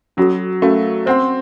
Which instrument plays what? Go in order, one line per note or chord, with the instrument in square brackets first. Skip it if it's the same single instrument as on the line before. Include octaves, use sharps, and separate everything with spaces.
[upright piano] F#3 [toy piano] C#4 F#4 A4
[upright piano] A3 [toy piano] C#4 F#4 A#4 F5
[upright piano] C4 [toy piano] C5 F#5 C6